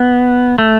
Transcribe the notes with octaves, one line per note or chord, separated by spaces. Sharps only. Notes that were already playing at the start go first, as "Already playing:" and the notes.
Already playing: B3
A3